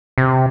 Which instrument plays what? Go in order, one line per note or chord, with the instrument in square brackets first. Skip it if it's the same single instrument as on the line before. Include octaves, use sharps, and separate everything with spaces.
[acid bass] C3